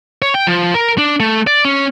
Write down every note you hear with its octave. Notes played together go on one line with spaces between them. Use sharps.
C#5
G5
F3
A#4
D4
A3
D5
C#4